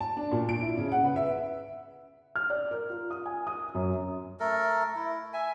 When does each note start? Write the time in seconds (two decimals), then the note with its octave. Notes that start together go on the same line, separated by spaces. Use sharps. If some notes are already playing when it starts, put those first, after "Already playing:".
0.01 A5
0.17 D4
0.32 A#2
0.49 D7
0.61 E4
0.77 C#3
0.92 F#5
1.04 B4
1.16 E5
2.36 F6
2.50 D5
2.71 A#4
2.90 F4
3.11 D#6
3.26 G#5
3.47 D#6
3.75 F#2
4.40 A3 A4 A#4
4.95 E4
5.33 E5 G#5